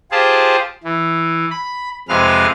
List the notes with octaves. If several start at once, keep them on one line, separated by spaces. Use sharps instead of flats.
F4 G4 G#4 C5 A5
E3
B5
F2 C3 G#3 B4 F5 F6